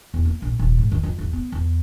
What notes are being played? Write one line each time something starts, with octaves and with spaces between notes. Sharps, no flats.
E2
A#3
A#1
D#1
G#2
D#2
F2
E2
B3
E2